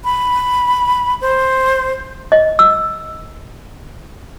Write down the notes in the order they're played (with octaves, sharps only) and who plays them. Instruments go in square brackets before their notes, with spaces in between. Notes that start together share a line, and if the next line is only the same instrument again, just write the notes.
[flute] B5
C5
[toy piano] D#5
E6